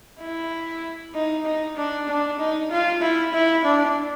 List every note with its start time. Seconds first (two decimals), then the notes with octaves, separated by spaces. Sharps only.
0.21 E4
1.15 D#4
1.45 D#4
1.77 D4
2.08 D4
2.39 D#4
2.70 F4
3.02 E4
3.33 E4
3.65 D4